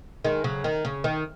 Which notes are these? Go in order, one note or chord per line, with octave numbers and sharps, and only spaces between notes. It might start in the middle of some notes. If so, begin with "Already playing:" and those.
D#3 G#3
C#3 F#3
D#3
C#3
D#3